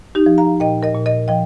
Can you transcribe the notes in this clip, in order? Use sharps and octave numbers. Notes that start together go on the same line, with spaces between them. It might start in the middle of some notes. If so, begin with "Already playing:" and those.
D#4 G4
F3
F5 A#5
A#2 D#5 G5
A#4 D#5
A#2
A#4 D#5
F3 D#5 G5